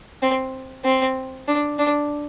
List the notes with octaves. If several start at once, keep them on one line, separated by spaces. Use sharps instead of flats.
C4
C4
D4
D4